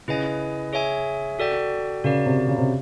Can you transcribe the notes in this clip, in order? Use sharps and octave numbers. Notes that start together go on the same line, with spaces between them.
C#3 E4 G#4 B4 D#5 G#5
G#4 C#5 E5 G#5
F#4 A4 D5 G5
C#3 F#4 A#4 D5
C3
C#3
C3